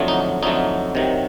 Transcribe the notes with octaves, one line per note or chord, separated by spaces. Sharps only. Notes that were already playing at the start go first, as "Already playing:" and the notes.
Already playing: F2 D3 F#3 A3
D#4
F2 D3 F#3 A3 D#4
C3 D#3 F#3